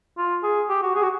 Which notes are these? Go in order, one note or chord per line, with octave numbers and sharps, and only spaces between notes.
F4
G#4
G4
F#4
G#4
F#4